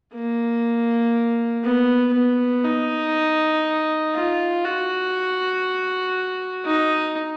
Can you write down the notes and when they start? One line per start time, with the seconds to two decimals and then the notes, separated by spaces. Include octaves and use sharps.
0.14 A#3
1.64 B3
2.13 B3
2.65 D#4
4.14 F4
4.65 F#4
6.65 D#4